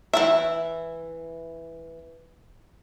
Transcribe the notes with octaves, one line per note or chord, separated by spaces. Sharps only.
E3 E4 E5